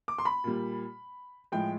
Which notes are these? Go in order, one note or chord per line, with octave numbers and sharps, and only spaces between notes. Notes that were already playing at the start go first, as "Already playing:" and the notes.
D6
C6
B5
A#2 G3
A2 F3 G#3 G5